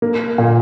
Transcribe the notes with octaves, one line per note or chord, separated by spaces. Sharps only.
A#3
A#2